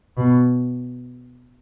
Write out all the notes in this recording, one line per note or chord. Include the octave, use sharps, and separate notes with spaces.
B2